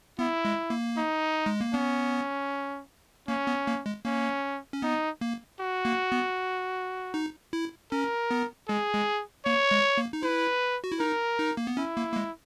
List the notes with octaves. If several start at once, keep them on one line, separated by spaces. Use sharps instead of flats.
B3 E4
G#3
A#3
D#4
G#3
A#3
B3 C#4
A#3 C#4
B3
A#3
G#3
A#3 C#4
C#4
B3 D#4
A#3
F#4
A#3
B3
D#4
E4
C#4 A#4
B3
G#3 G#4
G#3
A#3 C#5
G#3
A#3
D#4
E4 B4
F#4
E4
D#4 A#4
D#4
A#3
B3
C#4 E4
A#3
A#3
G#3